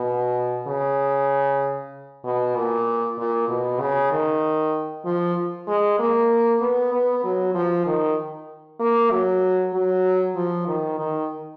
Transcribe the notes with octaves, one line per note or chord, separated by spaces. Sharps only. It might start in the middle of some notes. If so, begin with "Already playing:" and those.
Already playing: B2
C#3
B2
A#2
A#2
B2
C#3
D#3
F3
G#3
A#3
B3
B3
F#3
F3
D#3
A#3
F#3
F#3
F3
D#3
D#3